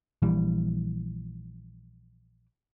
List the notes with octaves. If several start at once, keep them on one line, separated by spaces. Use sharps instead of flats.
A#1 E3 G3